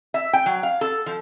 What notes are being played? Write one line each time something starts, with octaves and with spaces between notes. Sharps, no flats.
E5
G5
F#3
F5
A4
F3